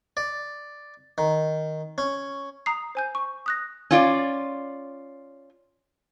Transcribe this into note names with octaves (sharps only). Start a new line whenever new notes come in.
D5
D#3
C#4
A#5 D#6 C7
C5 G#5 G6
C#6
D#6 F#6 A#6
C#4 F4 D5